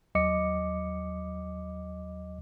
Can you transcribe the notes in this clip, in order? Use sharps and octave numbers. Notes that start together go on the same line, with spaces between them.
D#2 F#3 D#5 D6 C#7